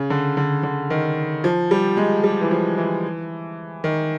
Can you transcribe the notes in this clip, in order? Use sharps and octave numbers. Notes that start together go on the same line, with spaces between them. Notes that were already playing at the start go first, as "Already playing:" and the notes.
Already playing: C#3
D3
D3
D3
D#3
F3
G3
G#3
G3
E3
F3
E3
D#3